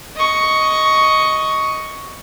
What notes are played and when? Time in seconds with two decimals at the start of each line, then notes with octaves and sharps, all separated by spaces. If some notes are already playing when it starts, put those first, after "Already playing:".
0.16 D#5 C#6